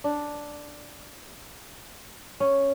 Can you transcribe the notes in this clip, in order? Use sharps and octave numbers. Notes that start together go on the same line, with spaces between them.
D4
C#4